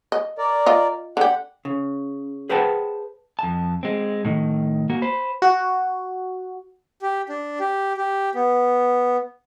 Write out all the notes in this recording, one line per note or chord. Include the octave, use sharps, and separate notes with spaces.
D#5
A#4 D5
F4 D#5
D3 G4 F#5
C#3
G#4 B4 C5 F#5 G5 A5
F2 A5
G#3 C4
A2 D#3
A#3 F#4
C5 B5
F#4
G4
D4
G4
G4
B3